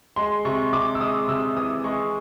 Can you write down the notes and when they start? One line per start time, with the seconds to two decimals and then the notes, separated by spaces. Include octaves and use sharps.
0.16 G#3 C6
0.45 C3 C#6
0.73 C3 D6
0.95 E6
1.00 G#3 D#6
1.28 C3 E6
1.57 E3 D#6
1.84 G#3 C#6